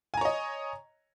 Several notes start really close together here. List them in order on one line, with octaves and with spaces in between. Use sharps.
G#5 A#5 C#5 D#5